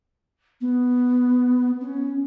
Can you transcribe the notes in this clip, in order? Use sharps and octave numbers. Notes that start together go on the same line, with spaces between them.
B3
C#4